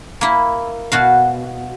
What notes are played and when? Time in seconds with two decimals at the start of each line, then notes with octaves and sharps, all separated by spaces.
0.21 A#3 E4
0.92 B2 F#4 F5